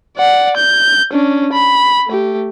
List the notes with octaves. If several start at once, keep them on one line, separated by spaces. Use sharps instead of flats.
D5 F#5
G6
C#4 D4
B5
A3 G4